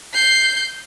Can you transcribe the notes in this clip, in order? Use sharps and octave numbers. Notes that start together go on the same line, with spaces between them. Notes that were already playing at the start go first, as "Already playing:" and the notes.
G6 C7